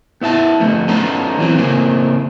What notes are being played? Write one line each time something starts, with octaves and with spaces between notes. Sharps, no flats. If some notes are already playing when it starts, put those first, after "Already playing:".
B3 E4 E5 A5
D3 F3 A3
B3 C#4 D#4 F4 A4
E3 F#3 C4
C#3 A#3 C4 A#4